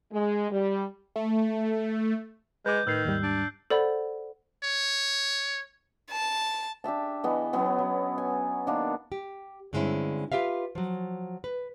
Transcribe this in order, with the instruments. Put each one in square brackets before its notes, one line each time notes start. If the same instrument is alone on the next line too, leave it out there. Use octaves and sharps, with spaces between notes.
[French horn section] G#3
G3
[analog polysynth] A3
[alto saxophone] G#3 [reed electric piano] B4 D6 [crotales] G6
[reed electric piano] A2 B4 [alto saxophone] D#3 [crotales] E6 F#6 C7
[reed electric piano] D#2 G#2 G3
[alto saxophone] D4
[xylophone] A4 C5 D5 F#5 B5
[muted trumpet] C#5
[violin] A5
[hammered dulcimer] D4 G4 E5 A5
E3 B3 D#5
F#3 B3 C#4
F#3
G#5
D#3 A#3 B3 D4
[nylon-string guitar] G4
G2 D3 G#3 C4 C#4 E4
F4 G4 B4 E5 F5
F3 F#3
B4